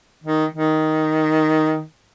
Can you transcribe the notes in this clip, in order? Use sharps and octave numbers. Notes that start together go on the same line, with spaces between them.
D#3
D#3